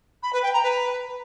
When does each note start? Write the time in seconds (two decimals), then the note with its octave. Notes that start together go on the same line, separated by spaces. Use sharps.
0.23 B5
0.33 B4
0.43 G5
0.53 A#5
0.63 B4